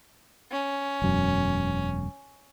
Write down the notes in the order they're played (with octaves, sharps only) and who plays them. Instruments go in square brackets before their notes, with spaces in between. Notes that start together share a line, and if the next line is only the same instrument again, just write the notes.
[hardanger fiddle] C#4
[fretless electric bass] E1 F#2